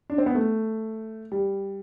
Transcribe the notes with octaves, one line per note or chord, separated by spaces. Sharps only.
D4
C4
B3
A3
G3